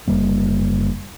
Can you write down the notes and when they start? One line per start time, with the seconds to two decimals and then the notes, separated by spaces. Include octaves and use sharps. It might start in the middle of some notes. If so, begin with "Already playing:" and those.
0.08 F#1 G3 A#3